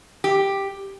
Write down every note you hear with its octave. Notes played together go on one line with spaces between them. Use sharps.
G4